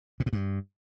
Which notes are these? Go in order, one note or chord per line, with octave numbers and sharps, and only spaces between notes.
A#2
A2
G2